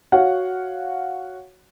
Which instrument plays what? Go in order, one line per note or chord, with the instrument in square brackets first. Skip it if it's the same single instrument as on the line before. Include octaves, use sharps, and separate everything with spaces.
[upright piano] F#4 C#5 F5 F#5